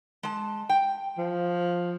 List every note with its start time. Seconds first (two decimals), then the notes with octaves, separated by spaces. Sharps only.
0.23 G#3 A5
0.69 G5
1.18 F3